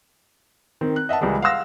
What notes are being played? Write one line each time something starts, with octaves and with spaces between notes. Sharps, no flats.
D#3 C4
F#6
D#5 E5 F#5 A5
C#2 E3 G3 G#3
F5 F#5 C6 E6 A#6